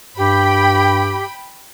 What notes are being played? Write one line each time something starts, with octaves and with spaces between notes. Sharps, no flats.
G2 G4 G5 B5